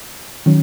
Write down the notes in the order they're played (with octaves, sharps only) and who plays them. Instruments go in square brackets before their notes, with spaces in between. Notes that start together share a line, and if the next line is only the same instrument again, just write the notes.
[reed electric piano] D#3 F#3 C#4